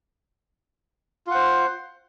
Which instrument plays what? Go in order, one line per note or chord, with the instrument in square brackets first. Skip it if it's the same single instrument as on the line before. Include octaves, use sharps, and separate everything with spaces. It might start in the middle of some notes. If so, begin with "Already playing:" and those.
[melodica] F4
F#5
C5